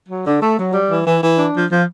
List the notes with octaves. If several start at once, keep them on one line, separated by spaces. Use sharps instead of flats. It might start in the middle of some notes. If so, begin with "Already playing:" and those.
F#3
D3
A3
F#3
G3
E3
E3
E3
D4
F3
F3